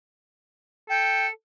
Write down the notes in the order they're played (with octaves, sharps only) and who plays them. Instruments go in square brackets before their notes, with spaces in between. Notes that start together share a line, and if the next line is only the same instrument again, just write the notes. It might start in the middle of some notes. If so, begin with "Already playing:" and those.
[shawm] A4 [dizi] G5